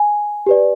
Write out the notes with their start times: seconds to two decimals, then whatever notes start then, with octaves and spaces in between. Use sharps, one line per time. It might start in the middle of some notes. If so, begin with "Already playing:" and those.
Already playing: G#5
0.46 G4 B4 D5